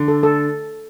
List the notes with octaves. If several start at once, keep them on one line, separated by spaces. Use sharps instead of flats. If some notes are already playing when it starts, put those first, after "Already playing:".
Already playing: D3
A4
A4